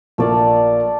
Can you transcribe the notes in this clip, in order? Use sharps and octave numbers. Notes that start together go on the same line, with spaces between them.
A#1 A3 A#3 D5 F5